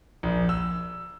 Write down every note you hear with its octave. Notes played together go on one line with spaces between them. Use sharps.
A#1
E6